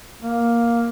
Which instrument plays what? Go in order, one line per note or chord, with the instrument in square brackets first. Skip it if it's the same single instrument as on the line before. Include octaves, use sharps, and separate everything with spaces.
[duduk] A#3